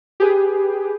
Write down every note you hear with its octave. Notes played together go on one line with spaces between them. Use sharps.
G4 G#4 B4